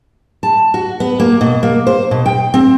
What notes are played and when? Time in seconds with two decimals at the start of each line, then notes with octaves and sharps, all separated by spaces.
0.43 A5
0.74 F#4
1.00 B3
1.20 A#3
1.41 B2
1.63 A#3
1.87 C5
2.11 B2
2.26 G5
2.54 C4